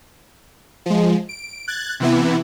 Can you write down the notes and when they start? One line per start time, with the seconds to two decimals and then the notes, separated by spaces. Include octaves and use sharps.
0.86 F3 G#3
1.29 D7
1.68 F#6 G#6 A6
2.00 C3 E3 B3 E4